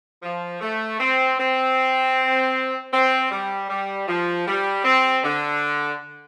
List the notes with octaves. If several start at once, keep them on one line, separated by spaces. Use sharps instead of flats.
F3
A3
C4
C4
C4
G3
G3
F3
G3
C4
D3